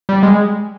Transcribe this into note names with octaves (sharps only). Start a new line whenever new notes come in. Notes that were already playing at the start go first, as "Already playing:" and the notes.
G3
G#3